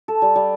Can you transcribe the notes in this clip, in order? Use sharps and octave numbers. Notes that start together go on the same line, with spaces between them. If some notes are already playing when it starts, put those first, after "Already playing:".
A4
G3
G3